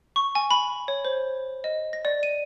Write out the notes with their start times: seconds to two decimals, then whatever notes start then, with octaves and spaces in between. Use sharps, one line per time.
0.16 C#6
0.35 G#5
0.51 B5
0.88 C#5
1.05 C5
1.64 D#5
1.93 A#6
2.05 D5
2.23 D#7